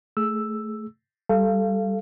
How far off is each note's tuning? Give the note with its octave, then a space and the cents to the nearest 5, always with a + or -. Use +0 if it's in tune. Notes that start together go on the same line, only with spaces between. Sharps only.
A3 +0 G#4 +15 E6 +0
G3 +0 A4 +0 F5 -25